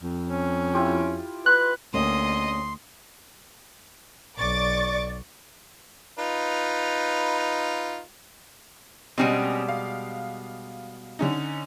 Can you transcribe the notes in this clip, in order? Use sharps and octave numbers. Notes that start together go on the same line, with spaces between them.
F2
C#4
E4 F4 G4
B4 C6 F#6
D2 A#3 C#4 G4 D#5 C6
B1 D5 C#6 D6 A6
D#4 F4 B4
B2 G3 G#3 C4 C#4
F5
D3 C#4 D#4